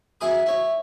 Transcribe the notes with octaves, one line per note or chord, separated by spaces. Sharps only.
F#2 E4 G#4 B5 D#6
E4 C#5